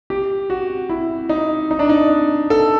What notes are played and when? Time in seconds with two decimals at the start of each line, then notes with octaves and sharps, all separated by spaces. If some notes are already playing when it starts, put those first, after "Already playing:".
0.10 G4
0.50 F#4
0.89 E4
1.29 D#4
1.71 D#4
1.79 D4
1.89 D#4
2.50 A4